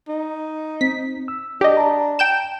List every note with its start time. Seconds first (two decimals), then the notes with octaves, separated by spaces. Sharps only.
0.09 D#4
0.81 C4 B6
1.28 E6
1.61 D4 G4 D#5
1.77 A5 A#5
2.19 G5 G6 E7